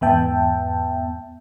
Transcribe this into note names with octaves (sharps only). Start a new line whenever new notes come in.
E2 G#2 B3 E5 G5 A5